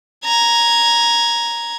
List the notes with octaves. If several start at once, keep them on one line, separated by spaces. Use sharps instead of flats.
A#5 G#6